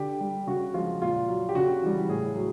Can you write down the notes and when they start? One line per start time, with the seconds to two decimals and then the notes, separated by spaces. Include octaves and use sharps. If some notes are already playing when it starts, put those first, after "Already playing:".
Already playing: D3 G4
0.21 G3
0.47 C#3 F#4
0.74 F3 G#3 F4
1.02 A#2 F4
1.28 F#3
1.49 G4
1.55 C#3 F#4
1.82 E3 G3
2.09 A2 G#4
2.36 F#3